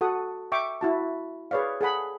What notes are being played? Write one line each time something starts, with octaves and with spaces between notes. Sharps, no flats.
F#4 A4 F#5 D#6
E5 G5 C#6 D6
E4 F#4 A5
G#4 B4 C#5 D5 F5
G#4 A4 F#5 B5